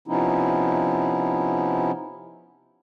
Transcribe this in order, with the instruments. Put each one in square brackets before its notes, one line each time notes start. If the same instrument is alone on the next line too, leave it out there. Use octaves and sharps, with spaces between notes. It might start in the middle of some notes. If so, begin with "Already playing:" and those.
[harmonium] C3 F3 B3 C#4 D#4 E4